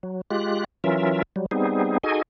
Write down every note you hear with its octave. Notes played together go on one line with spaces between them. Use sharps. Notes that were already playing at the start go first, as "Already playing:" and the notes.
F#3
G#3 F4 G4 F#6
E3 F#3 C#4 F4 A#4 E5
F#3 G3
G3 B3 C4 D#4 G#4
D#4 F#4 G#4 A4 D#5 G#5